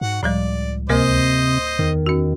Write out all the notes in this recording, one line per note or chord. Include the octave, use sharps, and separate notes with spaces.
G#2 F#4 F#5
C#2 A2 F3 G3 D5
D2 C3 A#3 A#4 C5 D#5
E2 D#3
C#4 F#4